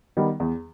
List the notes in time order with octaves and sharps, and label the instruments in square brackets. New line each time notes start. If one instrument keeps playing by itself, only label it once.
[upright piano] D#3 G3 B3
E2